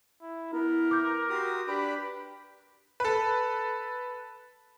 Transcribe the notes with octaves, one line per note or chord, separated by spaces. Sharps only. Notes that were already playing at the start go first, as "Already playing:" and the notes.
E4
B3 E4 A#4
D6 G6
F#4 G4 C6 D#6
D4 G4 B4 B5 D7
A4 B4